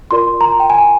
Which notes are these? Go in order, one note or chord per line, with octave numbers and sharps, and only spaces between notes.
F4 A#4 D5 C6
A#5
G5
G#5